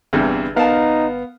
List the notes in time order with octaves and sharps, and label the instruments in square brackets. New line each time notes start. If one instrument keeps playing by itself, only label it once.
[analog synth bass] G1 [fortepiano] E2 G2 C3
[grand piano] B3 F5 [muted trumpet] D#4 [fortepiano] A#4 A5